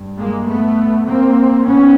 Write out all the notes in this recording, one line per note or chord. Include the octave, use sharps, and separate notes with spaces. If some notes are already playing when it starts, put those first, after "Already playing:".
Already playing: G2
G#3 A#3
A3 B3
A#3 C4
B3 C#4